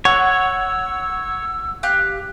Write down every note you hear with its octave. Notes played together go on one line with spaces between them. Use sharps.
C#5 F#5 E6
G4 F5 F#6